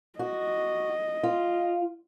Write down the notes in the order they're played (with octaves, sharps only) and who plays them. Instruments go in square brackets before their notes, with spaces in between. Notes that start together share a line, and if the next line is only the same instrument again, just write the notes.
[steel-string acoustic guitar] F#4 [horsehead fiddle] D#5
[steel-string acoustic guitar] F4